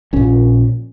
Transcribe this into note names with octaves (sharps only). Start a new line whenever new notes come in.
A#1 A#2 C#4